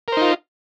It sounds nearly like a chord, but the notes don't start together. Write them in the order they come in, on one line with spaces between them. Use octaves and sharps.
A#4 C5 D#4 F4